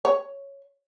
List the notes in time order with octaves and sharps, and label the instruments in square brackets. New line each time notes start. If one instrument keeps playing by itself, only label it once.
[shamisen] C#5